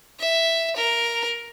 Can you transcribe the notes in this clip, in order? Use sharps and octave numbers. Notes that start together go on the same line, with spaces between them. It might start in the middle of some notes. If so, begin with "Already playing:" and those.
E5
A#4